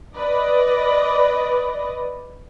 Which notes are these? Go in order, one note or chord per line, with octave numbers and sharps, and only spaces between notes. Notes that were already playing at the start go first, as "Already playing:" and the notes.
B4 D5 D#5